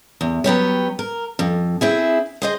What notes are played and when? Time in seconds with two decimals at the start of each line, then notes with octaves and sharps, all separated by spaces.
0.21 E2
0.44 F#3 B3 G4 C#5
0.99 A#4
1.39 F2
1.81 C4 E4 G#4
2.42 G#4 C5 D#5